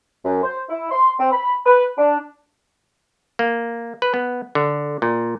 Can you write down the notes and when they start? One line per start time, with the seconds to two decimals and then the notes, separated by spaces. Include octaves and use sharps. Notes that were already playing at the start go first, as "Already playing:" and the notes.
0.25 F#2
0.43 C5
0.70 E4
0.91 C6
1.19 C4
1.32 B5
1.66 B4
1.98 D4
3.39 A#3
4.02 B4
4.14 B3
4.55 D3
5.02 A#2